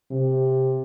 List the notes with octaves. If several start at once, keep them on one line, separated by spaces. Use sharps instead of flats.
C3